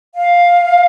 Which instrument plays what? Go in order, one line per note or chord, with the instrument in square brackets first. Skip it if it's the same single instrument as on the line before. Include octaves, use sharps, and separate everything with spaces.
[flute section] F5